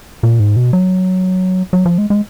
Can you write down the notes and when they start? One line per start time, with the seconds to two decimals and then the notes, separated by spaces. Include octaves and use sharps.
0.23 A#2
0.40 G#2
0.56 B2
0.73 F#3
1.73 F#3
1.85 F3
1.98 G#3
2.10 G#3